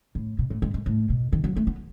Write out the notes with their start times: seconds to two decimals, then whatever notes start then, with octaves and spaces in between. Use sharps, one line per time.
0.15 A2
0.39 B2
0.50 A2
0.62 G#2
0.74 G#2
0.86 A2
1.10 B2
1.33 D#3
1.44 F#3
1.56 A3
1.67 B3